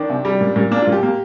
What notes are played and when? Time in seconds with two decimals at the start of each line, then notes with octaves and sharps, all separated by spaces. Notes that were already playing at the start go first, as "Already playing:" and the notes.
Already playing: D#3 D4
0.10 C3
0.25 G3
0.41 A#2
0.56 A#2
0.71 A#3 D4
0.82 F4
0.87 A#2
0.92 G4
1.03 A#3